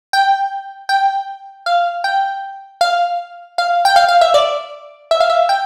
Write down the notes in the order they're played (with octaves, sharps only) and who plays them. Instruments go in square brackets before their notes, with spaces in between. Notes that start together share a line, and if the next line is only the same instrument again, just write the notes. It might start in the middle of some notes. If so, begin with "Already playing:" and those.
[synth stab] G5
G5
F5
G5
F5
F5
G5
F5
F5
E5
D5
E5
F5
E5
G5